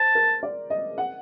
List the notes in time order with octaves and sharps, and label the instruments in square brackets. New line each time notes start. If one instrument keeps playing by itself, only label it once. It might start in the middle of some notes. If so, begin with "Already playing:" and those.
Already playing: [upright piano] C5 [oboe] A5
[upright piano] A#4
D5
D#5
F#5